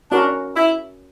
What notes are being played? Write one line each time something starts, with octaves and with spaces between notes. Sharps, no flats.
C#4 D4 F#4 A#4
E4